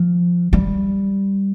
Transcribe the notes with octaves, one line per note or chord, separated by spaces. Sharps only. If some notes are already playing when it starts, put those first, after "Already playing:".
Already playing: F3
G3